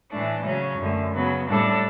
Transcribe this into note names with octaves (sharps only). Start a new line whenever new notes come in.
A2 E3 A3 D4
C#3 F#3 C#4
F#2 D3 A3
C#3 F#3 B3
A2 G3 D4 A4